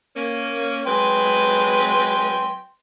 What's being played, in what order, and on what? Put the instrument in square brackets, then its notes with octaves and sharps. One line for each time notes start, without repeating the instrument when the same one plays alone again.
[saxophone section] A#3 C#4
[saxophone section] F#3 G#3 B4 [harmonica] G5 G#5 C6